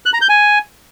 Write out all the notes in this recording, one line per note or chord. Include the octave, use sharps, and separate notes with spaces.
F#6
A#5
G6
G#5